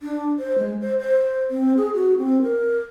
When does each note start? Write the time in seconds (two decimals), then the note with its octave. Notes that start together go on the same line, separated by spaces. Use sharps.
0.01 D4
0.39 C5
0.58 G#3
0.81 C5
1.00 C5
1.50 C4
1.77 G#4
1.95 F#4
2.18 C4
2.42 A#4